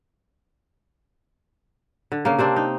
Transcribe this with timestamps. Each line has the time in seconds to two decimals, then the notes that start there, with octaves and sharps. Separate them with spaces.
2.12 D3
2.25 C#3 A#3
2.39 C3 C4 D4
2.56 D#4